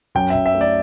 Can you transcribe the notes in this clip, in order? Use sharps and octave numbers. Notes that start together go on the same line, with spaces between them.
F#2 G5
F#2 E5
E5
A3
D5